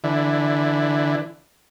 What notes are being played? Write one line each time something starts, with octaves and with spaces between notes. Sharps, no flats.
D3 E3